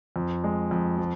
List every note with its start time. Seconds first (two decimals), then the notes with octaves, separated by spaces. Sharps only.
0.16 F2
0.44 G#3
0.71 F2
0.98 F3